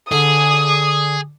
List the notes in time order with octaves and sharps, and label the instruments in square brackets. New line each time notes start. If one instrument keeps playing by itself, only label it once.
[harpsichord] D3 [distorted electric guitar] G#4 [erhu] D#6